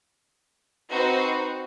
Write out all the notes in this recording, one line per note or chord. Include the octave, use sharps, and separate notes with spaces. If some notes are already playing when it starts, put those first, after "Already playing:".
C4 D#4 F#4 B4 C5